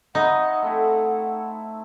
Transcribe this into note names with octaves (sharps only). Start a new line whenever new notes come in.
D#4 E4 B4 C5 F#5
A3 C4 E4